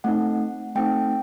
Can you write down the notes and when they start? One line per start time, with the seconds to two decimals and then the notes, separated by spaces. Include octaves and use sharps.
0.04 A3 C4 D#4 F#5
0.75 A3 C4 D#4 G5